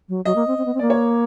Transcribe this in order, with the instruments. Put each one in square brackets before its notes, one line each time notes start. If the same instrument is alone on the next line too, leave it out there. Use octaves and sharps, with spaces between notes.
[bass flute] F#3
[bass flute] F#3 [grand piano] D#5
[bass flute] A#3
C4
C4
B3
C4
[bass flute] A#3 [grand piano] D5
[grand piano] C#5